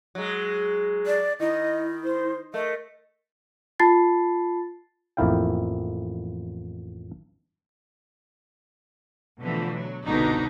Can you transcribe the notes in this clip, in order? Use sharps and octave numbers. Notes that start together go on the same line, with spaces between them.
F#3 G#3
D5
D#3 E4 D#5
C5
A3 A#4 D#5
F4 A5 B5 A6 C7
A1 F2 A#3 E4 F5 G5
B2 D3 E3 F3 A3
F#3
G1 C2 B2 D3 D4 D#4